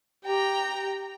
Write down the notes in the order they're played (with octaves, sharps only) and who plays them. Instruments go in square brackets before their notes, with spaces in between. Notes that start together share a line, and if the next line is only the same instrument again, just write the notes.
[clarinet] G4 [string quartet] G5 A#5